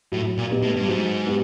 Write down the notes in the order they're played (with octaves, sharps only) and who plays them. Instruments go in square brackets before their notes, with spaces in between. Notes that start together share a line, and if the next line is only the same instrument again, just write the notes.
[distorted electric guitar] A2 [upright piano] F#3
[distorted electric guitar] A#2
[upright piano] B3 D#4 G4
[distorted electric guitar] A2
G2
[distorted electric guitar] G#2 [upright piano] F#3
[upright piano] B3 D#4 G4